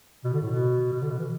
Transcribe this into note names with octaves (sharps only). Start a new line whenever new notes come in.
B2
D3
A2
B2
B2
D3
B2
E3